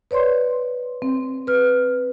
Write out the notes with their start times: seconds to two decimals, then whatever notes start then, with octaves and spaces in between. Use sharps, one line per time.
0.11 B4 C#5 D5 C6
1.02 C4
1.47 B4 F6